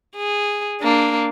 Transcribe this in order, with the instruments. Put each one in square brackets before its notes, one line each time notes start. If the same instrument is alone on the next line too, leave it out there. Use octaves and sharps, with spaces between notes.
[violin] G#4
A#3 D4